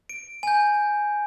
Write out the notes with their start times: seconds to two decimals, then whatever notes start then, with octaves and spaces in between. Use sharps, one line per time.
0.09 D7
0.43 G#5 G6